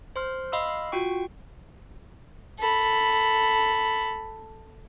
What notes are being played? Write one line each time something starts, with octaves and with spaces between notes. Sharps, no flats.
C5 C6 F6
D#5 F5 B5 C6 E6
F4 F#4 G5 C#6
A4 B5